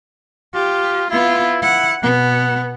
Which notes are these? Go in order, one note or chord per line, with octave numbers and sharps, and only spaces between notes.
F4 G4
B3 E4 F4
E4 F#5
B2 B3 F#5